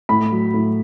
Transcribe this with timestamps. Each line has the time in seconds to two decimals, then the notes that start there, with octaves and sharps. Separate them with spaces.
0.09 A2 B5
0.32 F#3
0.54 A2